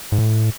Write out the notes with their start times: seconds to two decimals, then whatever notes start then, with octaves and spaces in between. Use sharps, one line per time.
0.12 G#2
0.19 A2